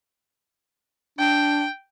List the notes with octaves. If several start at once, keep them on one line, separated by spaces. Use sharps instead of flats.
D4 G5